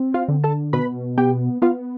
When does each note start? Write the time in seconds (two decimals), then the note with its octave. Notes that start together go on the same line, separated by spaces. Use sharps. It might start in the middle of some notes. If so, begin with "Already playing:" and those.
Already playing: C4
0.14 F4 F5
0.28 D3
0.44 A4 A5
0.73 B2 B4 B5
1.18 B3 G4 G5
1.62 B3 F4 F5